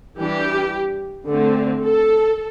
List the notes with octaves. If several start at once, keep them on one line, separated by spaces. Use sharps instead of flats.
E3 G3 D4 G4
D3 A3 C4
A4